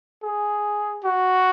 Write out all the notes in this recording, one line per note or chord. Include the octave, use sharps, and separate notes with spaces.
G#4
F#4